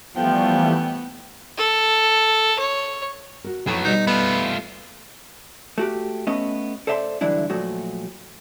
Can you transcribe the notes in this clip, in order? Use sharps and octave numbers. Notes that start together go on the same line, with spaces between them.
E3 F3 G3 A3 B3 G5
A4
C#5
F#4 A#4
F2 A2 F#3 B3 G5
B2 G3 D#4 D#5
A3 B3 F4
A3 F#4 G4
A3 B3 C#4 D#5
A4 C5 D5 E5 G#5 C6
G2 D3 E3 F#3 D4 E4
A#2 F3 F#3 A3 F#4